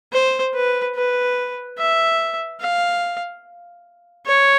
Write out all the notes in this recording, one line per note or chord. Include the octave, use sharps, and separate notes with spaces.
C5
B4
B4
E5
F5
C#5